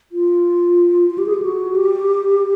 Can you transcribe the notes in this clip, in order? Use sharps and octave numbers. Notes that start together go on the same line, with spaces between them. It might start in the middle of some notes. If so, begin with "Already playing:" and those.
F4
F4
G4
G#4
G4
F#4
G4